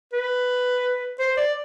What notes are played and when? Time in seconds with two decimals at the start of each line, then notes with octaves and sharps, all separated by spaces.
0.13 B4
1.19 C5
1.37 D5